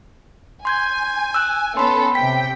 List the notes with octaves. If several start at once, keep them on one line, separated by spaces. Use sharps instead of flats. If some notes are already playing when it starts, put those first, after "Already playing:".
G#5 C6 G6 G#6
E6 F#6
B3 C#4 A4 B5 C6
C3 G5 B6